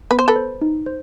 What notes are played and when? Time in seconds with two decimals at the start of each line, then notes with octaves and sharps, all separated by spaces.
0.11 B3 B4
0.19 C5
0.28 A4 B4
0.36 C5
0.61 D#4
0.86 C5